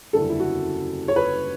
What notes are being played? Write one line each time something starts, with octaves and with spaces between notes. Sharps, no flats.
F#1 E2 D3 G3 A4
E4
F#4
C#5
B4